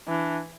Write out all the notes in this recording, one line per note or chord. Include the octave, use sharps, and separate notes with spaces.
E3 D4